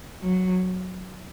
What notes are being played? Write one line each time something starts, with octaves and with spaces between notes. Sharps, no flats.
F#3